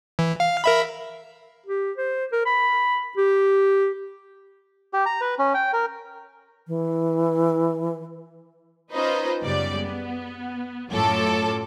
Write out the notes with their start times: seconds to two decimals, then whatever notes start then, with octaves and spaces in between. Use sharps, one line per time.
0.19 E3
0.40 F5
0.64 A#4 E5 B5
1.67 G4
1.98 C5
2.32 A#4
2.46 B5
3.17 G4
4.93 G4
5.06 A#5
5.21 B4
5.39 C#4
5.54 G5
5.73 A#4
6.68 E3
8.93 C#4 D#4 F4 B4 C5 D#5
9.43 F#2 C#3 G3 B3 D5
9.78 B3
10.91 F#2 A2 F4 A4 C#5 D6